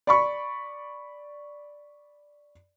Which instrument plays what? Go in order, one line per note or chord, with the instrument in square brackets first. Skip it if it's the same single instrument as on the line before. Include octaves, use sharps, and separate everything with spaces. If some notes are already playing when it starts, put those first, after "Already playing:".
[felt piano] D5 B5 C#6